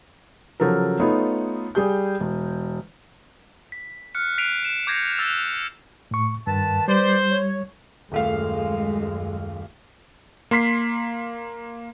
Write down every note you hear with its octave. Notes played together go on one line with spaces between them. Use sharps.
C#3 F3 F#3 A4 A#4
A3 B3 D#4 F4 C#5
G3 G#4 G6
E1
B6
F6 F#6 C#7
F#6 B6 C7 D7 D#7 F7
E7
D6 G6 G#6 A#6 C7 C#7
E6 F#6 A6 E7
A2 C#6
G2 D#3 B4 A5
G3 B4 C5 D5
C#5
D#1 F#2 G#3 A3 F5
A#3 C6 B6 C7